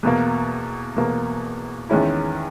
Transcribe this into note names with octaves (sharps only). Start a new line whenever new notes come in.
E2 B2 A#3
E2 B2 A#3
E2 D#3 G#3 C#4 E4